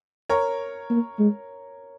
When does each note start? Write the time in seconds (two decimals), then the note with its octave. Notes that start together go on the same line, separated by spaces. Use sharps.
0.29 A#4 C#5
0.90 A#3
1.19 G#3